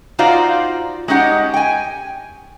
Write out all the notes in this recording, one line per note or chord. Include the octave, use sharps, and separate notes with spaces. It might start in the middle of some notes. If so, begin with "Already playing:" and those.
D#4 F4 F#4 C5 D5 F5
G#3 C#4 D#4 G4 F#5
G5 G#5